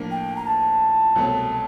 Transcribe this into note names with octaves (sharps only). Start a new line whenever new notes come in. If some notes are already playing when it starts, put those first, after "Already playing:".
Already playing: A2 F3 A#3 D4
G5
A#5
A5
C2 B2 F#3 A3 C4